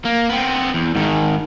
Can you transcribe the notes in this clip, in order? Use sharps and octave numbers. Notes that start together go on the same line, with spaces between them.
A#3
B3 C4
E2
G#2 D#3